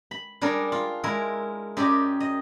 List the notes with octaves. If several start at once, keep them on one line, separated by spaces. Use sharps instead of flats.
B5
G3 D4 G#4 A#4
F4
G#3 E4 A#4
F#2 G4 D5 D#5
D#5